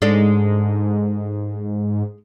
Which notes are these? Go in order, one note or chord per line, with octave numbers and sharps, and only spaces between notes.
G#2 G#3 D4 A4